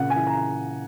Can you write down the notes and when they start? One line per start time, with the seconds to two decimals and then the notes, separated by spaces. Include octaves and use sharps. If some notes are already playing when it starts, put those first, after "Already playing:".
Already playing: A#2 C#3 F#5
0.10 E3 G#5
0.27 A#5